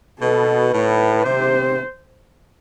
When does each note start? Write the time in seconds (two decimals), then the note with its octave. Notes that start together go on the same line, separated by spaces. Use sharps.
0.21 B2 A4
0.73 A2 B4
1.24 C3 C5